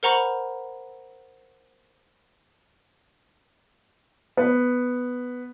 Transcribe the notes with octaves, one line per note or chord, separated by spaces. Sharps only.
A#4 C5 F#5 A#5 B5 C#6
B3